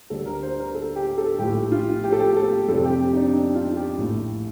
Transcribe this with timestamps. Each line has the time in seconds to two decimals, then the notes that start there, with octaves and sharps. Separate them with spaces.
0.10 D2 D3 G3 A4
0.26 A#4
0.42 C5
0.59 A#4
0.74 A4
0.96 G4
1.18 A4
1.39 A#1 A2 F3 G4
1.72 F4
2.04 G4
2.12 A4
2.20 G4
2.37 A4
2.68 F2 A4
2.71 C3 G3
2.84 G4
3.01 G4
3.13 D#4
3.16 D4
3.32 D#4
3.55 F4
3.76 G4
3.98 A#1 A2 A3